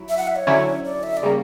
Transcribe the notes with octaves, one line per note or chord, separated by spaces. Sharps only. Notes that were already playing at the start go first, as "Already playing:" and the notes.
Already playing: F#3 E4
E5
F#5
E5
C#5
D3 F#3 C#4 E4
D5
E5
D5
C#3 G3 A#3